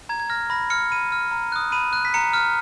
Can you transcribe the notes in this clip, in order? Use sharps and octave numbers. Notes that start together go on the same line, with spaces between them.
A#5 G#6
G#6
F6 A#6
B5 A#6
F6 C#7
B5 D#7
F6
A#5
D#6 F#6
B5 D#7
F#6
B6
A#5 C#7
F6